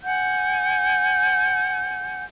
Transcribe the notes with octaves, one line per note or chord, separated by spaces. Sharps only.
F#5 G#5 G6